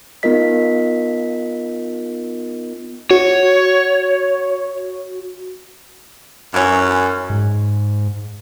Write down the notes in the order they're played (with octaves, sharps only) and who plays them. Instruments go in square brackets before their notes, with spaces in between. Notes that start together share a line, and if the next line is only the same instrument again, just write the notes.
[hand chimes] B3 D#4 F4 A#4 D#5 B6
[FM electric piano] F#4 [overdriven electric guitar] C#5
[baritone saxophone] F#2 [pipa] E3 C#4
[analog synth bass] G#2